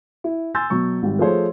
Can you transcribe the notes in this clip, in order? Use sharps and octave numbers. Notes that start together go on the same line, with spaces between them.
E4
G#5 C6 E6 G6 A6
B2 F#3 C#6
G#1 G3
F3 A3 G#4 A4 C5 C#5